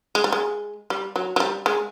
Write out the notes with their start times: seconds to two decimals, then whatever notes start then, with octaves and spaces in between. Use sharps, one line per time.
0.15 G#3
0.24 G3
0.32 G#3
0.90 G3
1.16 F#3
1.36 F#3
1.40 G3
1.66 G#3